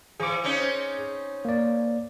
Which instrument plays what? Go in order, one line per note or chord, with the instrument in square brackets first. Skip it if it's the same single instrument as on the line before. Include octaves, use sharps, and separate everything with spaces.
[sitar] E3 [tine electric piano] G#4 D6
[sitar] C4 C#4 D#4
[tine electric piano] A#3 D5